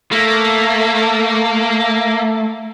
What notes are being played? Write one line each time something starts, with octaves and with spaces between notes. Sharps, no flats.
A3 A#3